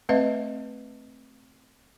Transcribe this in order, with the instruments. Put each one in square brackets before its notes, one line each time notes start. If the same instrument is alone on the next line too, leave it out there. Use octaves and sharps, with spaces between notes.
[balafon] A3 C4 B4 D#5 E5